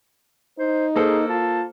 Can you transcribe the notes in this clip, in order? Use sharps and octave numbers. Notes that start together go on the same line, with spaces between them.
D#4 C5
A#3 G#4 A4 C5
F4 A5